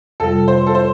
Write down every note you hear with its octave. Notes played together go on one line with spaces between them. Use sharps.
F2 C3 G3 F4 A4
C5
A4
C5